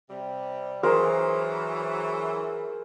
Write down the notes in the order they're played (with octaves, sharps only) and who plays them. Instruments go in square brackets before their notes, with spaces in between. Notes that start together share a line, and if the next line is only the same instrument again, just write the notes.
[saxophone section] C3 G3
[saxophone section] E3 F#3 [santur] G#4 A#4 C5